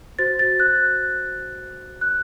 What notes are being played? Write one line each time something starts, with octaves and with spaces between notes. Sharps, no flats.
F#4 C5 A6
A6
F#6
F#6